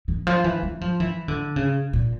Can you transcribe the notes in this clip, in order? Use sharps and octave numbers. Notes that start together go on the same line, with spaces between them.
E3
F3
E3
F#3
F3
E3
D3
C#3
A#2